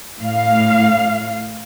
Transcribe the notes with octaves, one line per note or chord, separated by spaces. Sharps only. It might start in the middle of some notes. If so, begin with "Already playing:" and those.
A2 F5